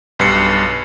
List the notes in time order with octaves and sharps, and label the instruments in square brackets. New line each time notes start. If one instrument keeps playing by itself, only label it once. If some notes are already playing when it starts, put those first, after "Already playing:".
[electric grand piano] B1 G2 G3 B4 C7 C#7